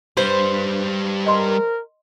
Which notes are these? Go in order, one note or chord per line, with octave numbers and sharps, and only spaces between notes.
G3 B4 C5
A#4 D#5 C6